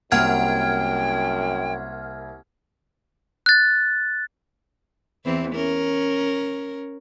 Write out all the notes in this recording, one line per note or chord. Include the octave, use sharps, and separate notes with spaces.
C2 F#2 A#3 F#5 G5 F6 G#6
F#6 A6
E2 E3 C4
C#4 A#4